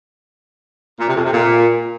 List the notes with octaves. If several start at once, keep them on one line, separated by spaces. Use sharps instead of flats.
A#2
C3
F2
C3
A#2